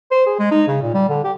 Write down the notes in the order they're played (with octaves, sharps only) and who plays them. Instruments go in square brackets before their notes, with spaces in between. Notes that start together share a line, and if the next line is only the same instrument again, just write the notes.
[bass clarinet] C5
G#4
G#3
D#4
C#3
A#2
G3
D3
G4